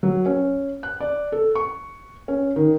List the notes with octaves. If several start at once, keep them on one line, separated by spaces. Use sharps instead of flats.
F#3
C#4
F#6
D5
A4
C#6
C#4
D#3